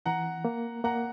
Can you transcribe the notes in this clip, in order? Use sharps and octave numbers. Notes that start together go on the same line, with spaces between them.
E3 F#5 A#5
A#3
A#3 F#5 A#5